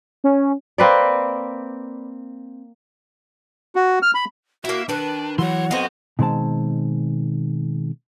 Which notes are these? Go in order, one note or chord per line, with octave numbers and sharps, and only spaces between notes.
C#4
A#3 C4 B4 D5
F#4
F6
B5
A#3 E4 F#4 E5
D#3 D4 B4 A5
E3 F#3 C#5 F#5 C6
B3 C4 F#4 A4 C5 D#5 F5
B2 D#3 G#3 C4 A5